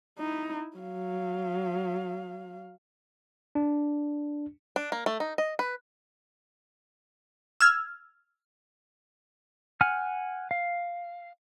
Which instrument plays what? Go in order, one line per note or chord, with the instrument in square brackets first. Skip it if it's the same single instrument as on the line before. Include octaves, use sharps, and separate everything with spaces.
[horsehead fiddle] D#4 E4
F#3 F5
[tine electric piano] D4
[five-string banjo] D4
A#3
A3
D#4
D#5
B4
[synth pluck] E6 F6 G#6
[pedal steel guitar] F#5 G#5 F6
F5